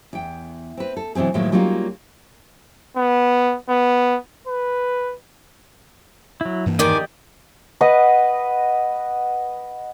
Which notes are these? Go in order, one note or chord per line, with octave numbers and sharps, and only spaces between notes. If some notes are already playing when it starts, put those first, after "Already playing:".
E2 G5
C4 B4
A4
B2 E3 F#3 C4 G#4
A2 D#3 F3 F#3 G#3 A#3
F#3 G3 A#3 C#4 D#4 F4
B3
B3
B4
F#3 E4
G2 E3 A#3
E2 D#3 G4 D5 D#5 G#5 D6
B4 D#5 F#5